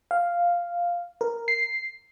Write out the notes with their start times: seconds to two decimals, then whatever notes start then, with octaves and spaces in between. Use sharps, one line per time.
0.11 F5
1.21 A#4
1.48 C7